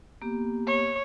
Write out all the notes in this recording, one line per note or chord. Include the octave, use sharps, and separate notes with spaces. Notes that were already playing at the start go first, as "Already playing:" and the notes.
A#3 B3 G4
C#5